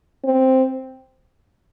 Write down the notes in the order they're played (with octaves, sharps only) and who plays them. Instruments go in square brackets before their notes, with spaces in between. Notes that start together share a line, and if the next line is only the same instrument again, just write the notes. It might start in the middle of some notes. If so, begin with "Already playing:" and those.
[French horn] C4